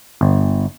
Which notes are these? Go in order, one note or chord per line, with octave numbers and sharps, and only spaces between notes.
G1